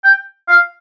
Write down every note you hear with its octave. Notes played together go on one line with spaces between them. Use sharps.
G5
F5